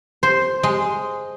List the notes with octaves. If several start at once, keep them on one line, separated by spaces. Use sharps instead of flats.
C5
G#3